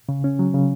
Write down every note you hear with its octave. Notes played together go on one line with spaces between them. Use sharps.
C#3
C#4
F#3
C#3